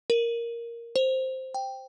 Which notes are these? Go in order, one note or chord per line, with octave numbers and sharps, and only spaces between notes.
A#4
C5
G5